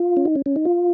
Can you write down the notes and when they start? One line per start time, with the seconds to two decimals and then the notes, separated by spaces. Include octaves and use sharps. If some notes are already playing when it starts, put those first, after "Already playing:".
Already playing: F4
0.17 C#4
0.25 D#4
0.35 C#4
0.46 C#4
0.56 D#4
0.65 F4